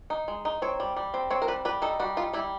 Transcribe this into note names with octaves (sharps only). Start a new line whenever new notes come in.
D#4
G#3
D#4
C4 C#5
G3
G3
C4
C4 C#5
A#4
G3 B4
G3 B4
D#4 A4
G3 F#4
D#4 F4
G3 E4